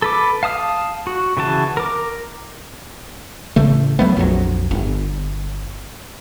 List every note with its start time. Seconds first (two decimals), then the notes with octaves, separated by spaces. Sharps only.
0.02 A4 B4 D6
0.43 F5 A5 D#6 F6
1.07 F#4
1.37 C#3 E3 F#4 A5
1.77 A#4 D6
3.56 A1 C#3 A3
3.99 F#3 A3 B3
4.17 A#1 F2 C#3 F#3
4.71 G1